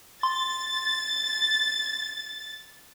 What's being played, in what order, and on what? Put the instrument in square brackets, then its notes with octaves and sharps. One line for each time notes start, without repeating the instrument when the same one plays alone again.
[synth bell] C6 [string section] A6